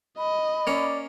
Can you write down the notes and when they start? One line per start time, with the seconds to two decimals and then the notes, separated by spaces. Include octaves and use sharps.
0.18 D#5 B5
0.67 A#3 C#4 D5